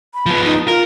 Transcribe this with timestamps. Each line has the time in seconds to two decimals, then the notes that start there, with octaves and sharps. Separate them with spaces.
0.14 B5
0.26 F3 B3
0.45 D#4
0.68 F4 A#4